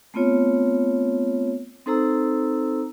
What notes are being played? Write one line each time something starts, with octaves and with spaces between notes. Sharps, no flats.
A3 B3 C4 F4 C#5
C4 D#4 A4 C5 A#5 E6